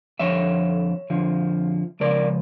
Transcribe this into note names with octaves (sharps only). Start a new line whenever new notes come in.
F2 D3 F3 C#5 E5
F2 D3 F3
C#2 C#3 F3 A#4 D5